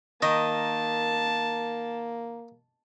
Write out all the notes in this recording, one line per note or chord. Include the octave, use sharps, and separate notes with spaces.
D#3 A#3 D#5 A5